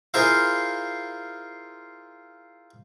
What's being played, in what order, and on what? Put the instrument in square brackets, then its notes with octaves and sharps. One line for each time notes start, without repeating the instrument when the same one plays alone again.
[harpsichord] E4 F4 G#4 A#4 C5 F5